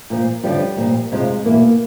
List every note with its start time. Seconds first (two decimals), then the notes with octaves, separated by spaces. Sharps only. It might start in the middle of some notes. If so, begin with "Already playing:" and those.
0.10 A#2 F3
0.43 F#2 D3 F3 G3
0.77 A#2 F3
1.12 F2 C3 F3 G#3
1.45 E2 B2 A#3